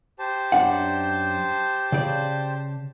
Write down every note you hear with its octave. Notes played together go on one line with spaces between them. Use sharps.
G4 C5 A5
F#2 D4 F#5
C#3 D5